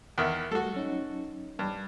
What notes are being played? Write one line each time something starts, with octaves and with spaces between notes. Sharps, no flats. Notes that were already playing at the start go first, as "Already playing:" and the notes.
E2 D#3 E5
G3 A3 F#4 A4
F#3 C#4 D#4
G2